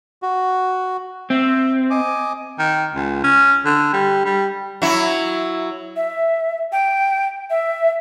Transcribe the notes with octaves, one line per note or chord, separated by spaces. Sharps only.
F#4
C4 E5
D#5 G#5 D6
D#3
C#2
C#4
D3
G3
G3
F#3 E4
E5
G5
E5